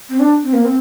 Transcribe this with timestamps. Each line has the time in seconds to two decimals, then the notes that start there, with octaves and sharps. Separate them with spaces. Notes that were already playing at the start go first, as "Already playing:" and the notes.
0.10 C4
0.20 D4
0.43 C4
0.53 A#3
0.65 C4